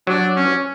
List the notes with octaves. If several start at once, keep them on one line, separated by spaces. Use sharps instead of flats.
F#3 D4
C#4